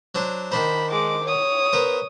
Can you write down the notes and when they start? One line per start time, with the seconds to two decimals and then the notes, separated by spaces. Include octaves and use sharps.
0.15 F#3 D4 C5
0.52 D#3 D4 C5 B5
0.91 G#3 D6
1.25 C#5 D#6
1.73 B3 A#4 C5